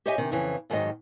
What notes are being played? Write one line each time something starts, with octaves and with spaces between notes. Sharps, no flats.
G4 C5 C#5 D#5 E5 G#5
C3 D#3 D4
F2 C#3 E3
F2 G#2 D#3 F#3 D#5